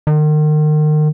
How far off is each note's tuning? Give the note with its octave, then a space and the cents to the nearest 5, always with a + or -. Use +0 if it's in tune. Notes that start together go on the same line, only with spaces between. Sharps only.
D#3 -35